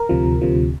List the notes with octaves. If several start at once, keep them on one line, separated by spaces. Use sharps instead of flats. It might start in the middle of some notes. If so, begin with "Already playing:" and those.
Already playing: A#4
D2 C3 F3
D2 C3 F3